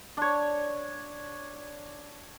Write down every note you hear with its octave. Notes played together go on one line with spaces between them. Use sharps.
D4 C#5